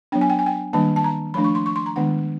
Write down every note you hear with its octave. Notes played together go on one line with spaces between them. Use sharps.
F#3 B3 D4 G5
G#5
G5
G#5
G5
D#3 G3 A#3 D4 A5
A5
A#5
F3 A3 D4 B5
C#6
C6
C#6
C6
A#5
D#3 G#3 B3 D4 F#5